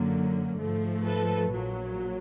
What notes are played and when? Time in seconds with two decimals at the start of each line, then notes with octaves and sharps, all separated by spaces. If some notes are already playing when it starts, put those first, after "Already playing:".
Already playing: F#2 D3 F#3 A#3
0.59 G#2 F3 A3
1.05 A4 B4
1.52 A#1 A#2 F#3